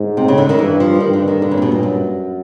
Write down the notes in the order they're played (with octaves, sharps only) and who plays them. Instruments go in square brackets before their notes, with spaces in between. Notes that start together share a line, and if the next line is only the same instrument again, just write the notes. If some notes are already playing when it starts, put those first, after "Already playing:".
Already playing: [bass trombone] G#2
[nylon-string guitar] C3
C#3
D3
D#3
[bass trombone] G2 [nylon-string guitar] E3
[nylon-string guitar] F3
[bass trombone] G2 [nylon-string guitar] D#3
[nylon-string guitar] D3
D#3
D3
C#3
A#2
B2
A#2
F#2